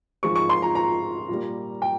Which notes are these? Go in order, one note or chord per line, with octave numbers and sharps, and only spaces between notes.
G#2 F3 G#3 C#6
C#6
C6
A#5
A#5
A#2 G3 A#3
G5